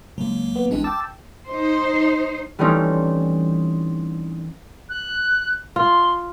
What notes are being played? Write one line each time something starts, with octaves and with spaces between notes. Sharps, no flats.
C#2 F#3 A#3
B3
A#1 E3 G#3 C4 D4
G5 A5 D6 E6 A6
D#4 C5
E3 G3 A3 C4 C#4 D#4
F#6
F4 C6